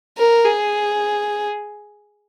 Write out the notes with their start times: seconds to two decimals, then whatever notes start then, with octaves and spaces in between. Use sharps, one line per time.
0.17 A#4
0.45 G#4